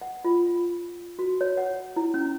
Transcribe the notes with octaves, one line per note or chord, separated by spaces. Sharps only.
F#5
F4
F#4
C#5
F#5
E4
C#4